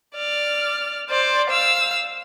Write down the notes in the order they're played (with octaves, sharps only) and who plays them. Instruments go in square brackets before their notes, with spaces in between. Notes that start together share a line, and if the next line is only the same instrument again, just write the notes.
[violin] D5 F6
C5 D5
F5 E6